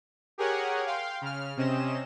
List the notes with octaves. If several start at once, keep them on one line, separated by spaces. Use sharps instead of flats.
G4 G#4 A#4 C#5 F#5 G#5
F5 G5 C6
C#3 F6
C3 C4 C#4 D#5 E7